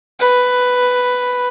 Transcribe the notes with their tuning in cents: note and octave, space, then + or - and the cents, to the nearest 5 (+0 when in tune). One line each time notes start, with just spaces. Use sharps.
B4 +5